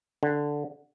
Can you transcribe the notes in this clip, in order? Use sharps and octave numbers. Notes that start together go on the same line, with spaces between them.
D3